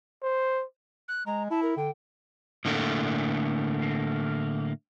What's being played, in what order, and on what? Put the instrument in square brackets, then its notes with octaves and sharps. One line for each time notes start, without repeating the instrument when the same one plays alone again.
[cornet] C5
[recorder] F#6
[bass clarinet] G#3 [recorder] A#5
[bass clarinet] E4 [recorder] A5
[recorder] A#4
[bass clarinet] D3 [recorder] G5
[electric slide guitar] A2 D3 A3 A#3